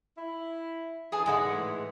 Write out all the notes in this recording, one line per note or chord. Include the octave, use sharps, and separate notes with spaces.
E4
D3 E3 G#4 G#5 A5
G#2 D3 G#3 F#5
A2 E3